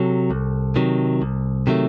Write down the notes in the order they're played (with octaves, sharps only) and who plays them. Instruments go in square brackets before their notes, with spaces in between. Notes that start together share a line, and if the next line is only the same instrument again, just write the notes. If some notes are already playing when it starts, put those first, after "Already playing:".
Already playing: [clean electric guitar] C3 F#3 A4
C2
C3 D#3 F#3
C2
C3 D#3 F#3 A3